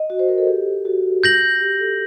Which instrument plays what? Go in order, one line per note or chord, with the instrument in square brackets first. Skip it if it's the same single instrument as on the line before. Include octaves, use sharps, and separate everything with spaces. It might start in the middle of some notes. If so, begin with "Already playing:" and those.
Already playing: [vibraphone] D#5
F#4
C5
A#4
A4
G4
F#4
[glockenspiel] G6 A#6 F#7
[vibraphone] G4
A4